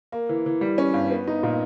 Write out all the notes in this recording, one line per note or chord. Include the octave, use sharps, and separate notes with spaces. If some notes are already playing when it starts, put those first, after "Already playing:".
A#3
E3
E3
G3
C#4
G2
B3
D#4
A#2